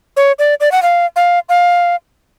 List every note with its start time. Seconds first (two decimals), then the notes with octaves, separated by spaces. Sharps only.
0.17 C#5
0.39 D5
0.60 D5
0.72 F#5
0.83 F5
1.16 F5
1.49 F5